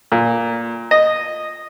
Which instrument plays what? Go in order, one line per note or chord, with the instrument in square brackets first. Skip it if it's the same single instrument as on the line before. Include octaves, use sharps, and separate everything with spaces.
[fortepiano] A#2
D#5